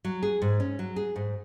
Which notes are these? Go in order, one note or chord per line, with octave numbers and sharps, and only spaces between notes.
F#3
G#4
G#2
C#4
F#3
G#4
G#2